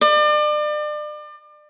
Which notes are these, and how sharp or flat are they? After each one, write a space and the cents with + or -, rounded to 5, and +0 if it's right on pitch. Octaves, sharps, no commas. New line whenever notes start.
D5 +35